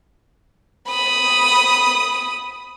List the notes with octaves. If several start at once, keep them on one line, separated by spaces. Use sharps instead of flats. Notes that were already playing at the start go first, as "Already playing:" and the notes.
B5 D#6